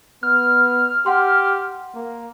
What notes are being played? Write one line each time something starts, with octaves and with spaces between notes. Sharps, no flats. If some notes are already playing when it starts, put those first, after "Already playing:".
B3 F6
G4 F#5 C6
A#3